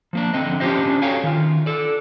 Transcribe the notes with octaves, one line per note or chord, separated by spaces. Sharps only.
F3 A#3 D4
D3 C4 D#5
C#4 D4 F4 G4 C5 D#5
F#4 A4 C#5 F5 G5 G#5
D#3 F4
A4 D5